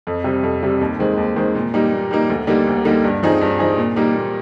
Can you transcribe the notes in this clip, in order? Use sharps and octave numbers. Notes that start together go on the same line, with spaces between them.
F2
C3 G3
F2
C3 G3
D#2
D#3 G#3 C4
D#2
D#3 G#3 C4
A#2
G3 A#3 D#4
A#2
G3 A#3 D#4
D2
D3 G3 A#3 D#4
D2
D3 G3 A#3 D#4
G2
F3 C4 D#4 G#4
G2
F3 C4 D#4 G#4
A#2
G3 A#3 D#4
A#2